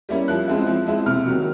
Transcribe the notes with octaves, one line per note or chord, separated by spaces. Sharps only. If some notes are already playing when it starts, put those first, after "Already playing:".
G3 A#3 C#4 E4
F3 F#6
G#3 C4 E4
F3
G#3 C4 E4
C3 F6
D#3 F#3